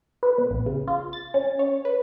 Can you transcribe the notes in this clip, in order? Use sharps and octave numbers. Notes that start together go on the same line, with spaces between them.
B4
B2
A#1
C#3
F4
A6
C#4
C#5
B4